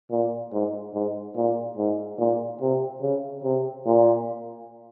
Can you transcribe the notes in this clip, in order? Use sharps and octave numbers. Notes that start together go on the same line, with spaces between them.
A#2
G#2
G#2
A#2
G#2
A#2
C3
C#3
C3
A#2